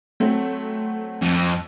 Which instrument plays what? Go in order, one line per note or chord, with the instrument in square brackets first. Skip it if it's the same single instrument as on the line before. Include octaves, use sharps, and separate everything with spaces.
[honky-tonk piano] F#3 A3 C4
[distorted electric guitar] F2